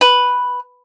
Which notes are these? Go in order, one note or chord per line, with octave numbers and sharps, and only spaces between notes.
B4